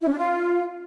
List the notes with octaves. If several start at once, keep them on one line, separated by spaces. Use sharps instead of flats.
E4
C#4
D4
F4